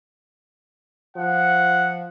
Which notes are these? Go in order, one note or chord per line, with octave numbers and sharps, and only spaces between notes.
F3 F#5